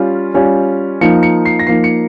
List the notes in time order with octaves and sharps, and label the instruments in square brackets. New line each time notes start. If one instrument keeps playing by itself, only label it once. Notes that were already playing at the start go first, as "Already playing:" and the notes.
Already playing: [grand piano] G3 C#4 F4
G3 C#4 F4
F3 A#3 D#4 C#7
C#7
C7
A#6
F3 A#3 D#4 C7
C#7